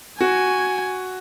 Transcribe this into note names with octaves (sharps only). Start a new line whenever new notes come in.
F#4 G#5